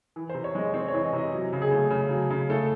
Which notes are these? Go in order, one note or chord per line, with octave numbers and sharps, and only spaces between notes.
E3
C3 C5
C#5
G#3 D#5
C4 C#5
C#5
E3
D#5
C3
D#5
F#3
C#3
G#4
A3
C#3
F#3
C#3
A3 A4